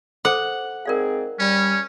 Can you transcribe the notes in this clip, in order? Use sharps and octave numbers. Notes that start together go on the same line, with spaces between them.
A4 C5 F#5 D6
G#2 C4 G#4 A#4 D5 F5
G3 C#4